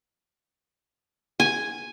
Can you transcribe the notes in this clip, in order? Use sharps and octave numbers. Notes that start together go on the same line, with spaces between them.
G#5